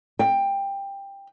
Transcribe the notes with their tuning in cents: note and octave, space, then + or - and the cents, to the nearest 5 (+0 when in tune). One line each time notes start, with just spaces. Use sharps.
G5 +15